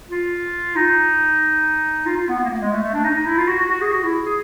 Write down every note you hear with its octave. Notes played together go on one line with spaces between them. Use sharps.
F4
D#4
F4
F4
B3
B3
A#3
A3
G#3
A3
A3
D4
D#4
D#4
E4
F4
F#4
F#4
F#4
G#4
F#4
E4
G#4